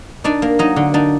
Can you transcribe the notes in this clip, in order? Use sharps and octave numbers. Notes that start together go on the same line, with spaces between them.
D4 D#4 D5
A#3
F#3 D#4 D#5
D3
D4 D#4 D5